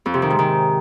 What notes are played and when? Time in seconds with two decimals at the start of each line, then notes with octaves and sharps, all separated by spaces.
0.06 F2
0.14 C3
0.22 D#3
0.30 G#2
0.39 D#3